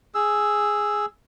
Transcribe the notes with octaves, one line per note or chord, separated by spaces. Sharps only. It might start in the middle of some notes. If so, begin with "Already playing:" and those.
G#4 E6